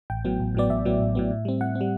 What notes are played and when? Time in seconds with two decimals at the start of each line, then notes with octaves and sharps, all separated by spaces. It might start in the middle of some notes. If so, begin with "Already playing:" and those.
0.10 A1 G5
0.25 A2 F#3 B3
0.40 A1
0.55 A2 F#3 B3 D5
0.70 A1 E5
0.85 A2 F#3 B3
1.00 A1
1.15 A2 F#3 B3
1.31 A2
1.45 G3 C4
1.61 A2 F#5
1.75 C4
1.81 G3